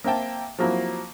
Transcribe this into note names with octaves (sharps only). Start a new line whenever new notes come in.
A#3 C4 E5 G5 A5
F3 F#3 A#3 C4 E4